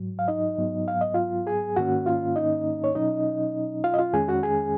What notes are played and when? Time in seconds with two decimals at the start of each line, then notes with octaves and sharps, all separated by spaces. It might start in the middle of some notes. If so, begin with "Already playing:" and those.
Already playing: G#2 F#3
0.19 F5
0.28 D#4 D#5
0.58 G#2 F#3 B3
0.88 F5
1.01 D#5
1.14 F4 F5
1.47 G#4 G#5
1.76 G#2 D#3 A#3 C#4 F#4 F#5
2.06 F4 F5
2.36 D#4 D#5
2.84 C#5
2.95 B2 F#3 C#4 D#4 D#5
3.84 F4 F5
3.94 D#5
3.98 F4 F5
4.13 F2 D#3 G#3 C#4 G#4 G#5
4.28 F#4 F#5
4.43 G#4 G#5